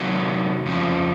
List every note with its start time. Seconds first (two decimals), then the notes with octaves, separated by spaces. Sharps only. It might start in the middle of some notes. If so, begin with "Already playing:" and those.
Already playing: C3 D#3 F#3
0.66 F2 C#3 F3